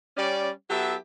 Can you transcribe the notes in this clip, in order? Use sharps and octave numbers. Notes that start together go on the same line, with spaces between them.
G3 C#4 D5
F#3 B3 E4 G4 A4 E5